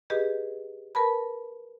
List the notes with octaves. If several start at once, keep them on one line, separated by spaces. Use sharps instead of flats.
G4 G#4 B4 D#5
A#4 B4 A5 B5